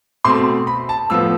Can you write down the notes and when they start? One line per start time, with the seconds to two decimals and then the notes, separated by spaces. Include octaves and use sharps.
0.25 B2 A3 C4 C6
0.67 B5
0.89 A5
1.10 A2 F3 B3 E6